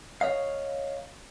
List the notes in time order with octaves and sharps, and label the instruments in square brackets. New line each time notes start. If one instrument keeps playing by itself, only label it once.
[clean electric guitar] C#5 D#5 F5